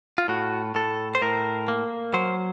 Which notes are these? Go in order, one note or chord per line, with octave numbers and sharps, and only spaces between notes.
F4
A2 F#4
A2 A4
C5
A2 A#4
A#3
F#3 C5